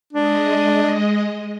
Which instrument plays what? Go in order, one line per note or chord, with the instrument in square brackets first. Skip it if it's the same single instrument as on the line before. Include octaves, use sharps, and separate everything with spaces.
[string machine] G#3 D#5 [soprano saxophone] D4